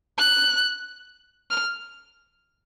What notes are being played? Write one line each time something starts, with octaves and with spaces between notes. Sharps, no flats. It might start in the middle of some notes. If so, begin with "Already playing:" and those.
F#6
F6